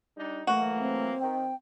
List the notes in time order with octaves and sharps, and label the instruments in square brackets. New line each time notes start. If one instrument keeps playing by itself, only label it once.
[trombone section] G3 D4 D#4
[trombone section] E3 F#3 A#3 [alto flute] A3 [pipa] F#4
[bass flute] C4
[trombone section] D#3 [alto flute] G5